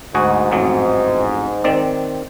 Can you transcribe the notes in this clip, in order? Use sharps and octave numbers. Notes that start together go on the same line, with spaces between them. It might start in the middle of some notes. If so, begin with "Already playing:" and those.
D2 G#2 F#4 G#4
A1 F2 F#3
D#3 C4 D5